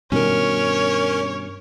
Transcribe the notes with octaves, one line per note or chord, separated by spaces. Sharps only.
G2 B2 D#3 C#4 A#4 C#5